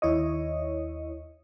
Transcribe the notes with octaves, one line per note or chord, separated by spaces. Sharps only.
D#2 E4 C#5 D#5